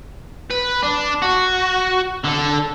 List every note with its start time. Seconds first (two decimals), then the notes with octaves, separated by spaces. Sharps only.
0.50 B4
0.83 D4
1.22 F#4
2.25 D3 A4